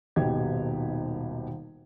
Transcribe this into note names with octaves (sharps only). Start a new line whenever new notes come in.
D#1 G#1 B2 G4 D#5 G#6